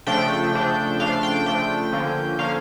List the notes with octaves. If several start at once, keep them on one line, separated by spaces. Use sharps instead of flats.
C#3 F3 A3 D4 G5
C#3 F3 A3 D4
C#3 F3 A3 D4 F5
G5
C#3 F3 A3 D4 G5
D3 F3 A#3 C#4
D3 F3 A#3 C#4 F5